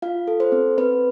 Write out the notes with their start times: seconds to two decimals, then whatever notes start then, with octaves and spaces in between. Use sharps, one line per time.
0.02 F4 F5
0.28 A4
0.40 C5
0.52 C4
0.78 C4 B4